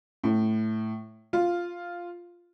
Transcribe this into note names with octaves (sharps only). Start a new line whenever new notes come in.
A2
F4